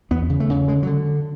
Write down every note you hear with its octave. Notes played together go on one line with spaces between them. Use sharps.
E2 B3
C#3
A3
C#3
D3 G#3
F#3
D3